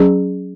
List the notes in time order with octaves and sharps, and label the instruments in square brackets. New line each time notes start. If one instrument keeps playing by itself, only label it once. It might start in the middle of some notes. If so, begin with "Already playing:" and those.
Already playing: [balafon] F#3 C#4 G#4